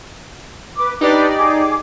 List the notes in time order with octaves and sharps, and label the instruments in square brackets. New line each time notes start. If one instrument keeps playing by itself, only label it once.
[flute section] B4 D6
[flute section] D4 B4 [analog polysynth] D#4 G4 D5
[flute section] G#4 D6